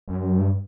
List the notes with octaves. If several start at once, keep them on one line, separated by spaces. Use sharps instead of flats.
F#2
G2